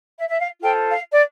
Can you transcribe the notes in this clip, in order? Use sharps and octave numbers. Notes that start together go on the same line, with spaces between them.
E5
E5
F5
F4 A4 C5 G5
F5
D5